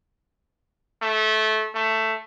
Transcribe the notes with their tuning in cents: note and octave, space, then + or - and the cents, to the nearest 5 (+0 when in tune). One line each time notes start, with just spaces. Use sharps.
A3 -20
A3 +10